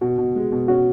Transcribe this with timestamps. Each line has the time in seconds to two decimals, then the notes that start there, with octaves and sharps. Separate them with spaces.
0.01 B2 F#4
0.18 B2
0.36 G#3
0.52 B2
0.68 C#4 F#4